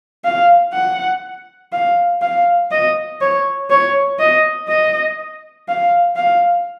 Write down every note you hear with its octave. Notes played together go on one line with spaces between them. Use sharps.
F5
F#5
F5
F5
D#5
C#5
C#5
D#5
D#5
F5
F5